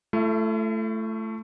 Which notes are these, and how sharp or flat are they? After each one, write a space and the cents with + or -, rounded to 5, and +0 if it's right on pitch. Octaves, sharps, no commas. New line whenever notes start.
A3 +0 E4 +45